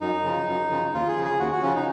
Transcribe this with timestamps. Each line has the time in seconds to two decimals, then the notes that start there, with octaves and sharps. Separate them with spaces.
0.01 F#2 D#4
0.24 C#3 F3
0.48 F#2
0.71 C#3 F3
0.93 D#2 F4
1.09 G#4
1.17 C#3 F3
1.24 G#4
1.39 D#2 F#4
1.52 F#4
1.62 C#3 F3 C#4
1.75 D#4